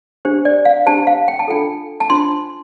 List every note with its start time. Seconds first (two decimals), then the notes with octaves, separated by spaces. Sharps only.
0.25 D4 G4 C5
0.45 D5
0.65 F5
0.86 D4 G4 C5 A5
1.07 F5
1.28 G5
1.39 A5
1.48 D4 F4 A4 G5
2.00 A5
2.10 D4 F4 C5 C6